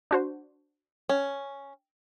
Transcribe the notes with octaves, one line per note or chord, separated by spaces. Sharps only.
D4 F#4 C5
C#4